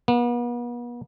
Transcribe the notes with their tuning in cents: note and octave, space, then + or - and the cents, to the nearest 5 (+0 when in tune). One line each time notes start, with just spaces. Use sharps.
B3 -40